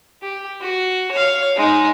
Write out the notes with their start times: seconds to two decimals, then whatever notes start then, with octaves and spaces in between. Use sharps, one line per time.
0.22 G4
0.61 F#4
1.11 C#5 F5
1.57 G#3 D#4